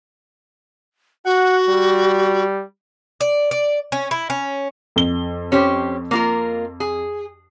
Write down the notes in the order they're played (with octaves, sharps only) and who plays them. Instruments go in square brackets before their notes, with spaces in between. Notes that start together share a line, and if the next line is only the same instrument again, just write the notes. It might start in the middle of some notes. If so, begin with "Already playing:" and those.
[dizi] F#4 [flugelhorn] F#5
[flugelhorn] G3
[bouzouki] D5
D5
C#4
E4
C#4
[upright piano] F2 G7
[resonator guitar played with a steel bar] C#4 G4 C5
A#3 F4 A#4
G#4